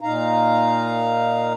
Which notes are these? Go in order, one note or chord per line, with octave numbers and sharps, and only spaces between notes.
A#2 D#4 F5 A#5